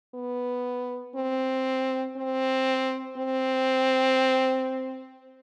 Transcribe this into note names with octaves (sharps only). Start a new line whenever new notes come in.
B3
C4
C4
C4